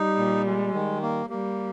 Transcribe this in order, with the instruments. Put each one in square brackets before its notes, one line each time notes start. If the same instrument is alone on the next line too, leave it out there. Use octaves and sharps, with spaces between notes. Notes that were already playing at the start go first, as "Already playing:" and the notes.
Already playing: [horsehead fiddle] G3 [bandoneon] D#4
[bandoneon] A#2
G#3
D#3
A#3
[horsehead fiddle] G3 [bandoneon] A#3